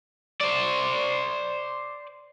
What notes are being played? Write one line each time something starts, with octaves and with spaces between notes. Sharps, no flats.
C5 D5